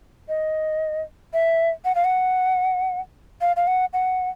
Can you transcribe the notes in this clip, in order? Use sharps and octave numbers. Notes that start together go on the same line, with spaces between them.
D#5
E5
F#5
F5
F#5
F5
F5
F#5
F#5